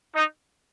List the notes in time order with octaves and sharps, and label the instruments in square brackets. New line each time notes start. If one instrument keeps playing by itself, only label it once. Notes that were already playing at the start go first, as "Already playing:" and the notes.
[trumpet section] D#4